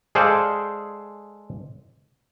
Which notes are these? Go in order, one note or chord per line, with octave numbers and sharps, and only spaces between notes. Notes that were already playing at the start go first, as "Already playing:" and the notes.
G#3 G#4 A4 C5 D5 F5